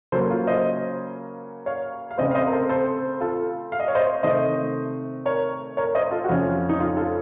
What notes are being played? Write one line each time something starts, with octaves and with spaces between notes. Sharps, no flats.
C#3 F#3 A#3 C#4 A4 C5
F4
C5 D#5
C#5 F5
F5
C#3 A3 C4 C5 D#5
F5
C5 D#5
A#4
A4 C5
A4 C5
F4 A4
F5
D#5
C#5
C5 D#5
C3 D#3 A3 C5 D#5
A#4 C#5
A#4 C#5
C5 D#5
F4 A4
F#4
F2 C#3 A3 C#4 F4
D#4
F4
F4 A4